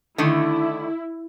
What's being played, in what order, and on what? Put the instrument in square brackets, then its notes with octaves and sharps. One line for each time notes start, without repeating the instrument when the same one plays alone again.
[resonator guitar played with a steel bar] D3 D#3 A3 [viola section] E4